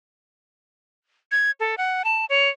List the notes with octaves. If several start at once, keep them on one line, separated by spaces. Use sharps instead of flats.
G#6
A4
F#5
A5
C#5